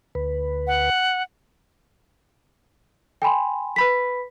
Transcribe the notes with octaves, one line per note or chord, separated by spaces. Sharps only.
D2 B4
F#5
G5 G#5 B5 C6
B4 B5 B6